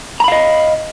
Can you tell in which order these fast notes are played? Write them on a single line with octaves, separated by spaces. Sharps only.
A#5 B5 F5 D#5